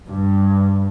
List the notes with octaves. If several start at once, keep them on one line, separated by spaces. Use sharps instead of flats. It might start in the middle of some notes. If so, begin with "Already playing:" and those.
G2